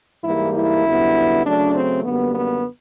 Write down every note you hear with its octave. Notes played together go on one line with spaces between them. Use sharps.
G#2 E3 G3 A#3 E4
E4
F#2 D3 G3 B3
C#3 F#3 A3 D4
C4
F#2 D3 G3 A#3 B3
B3